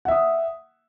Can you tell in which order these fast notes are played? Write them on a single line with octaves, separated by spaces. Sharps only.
F#5 E5 D#6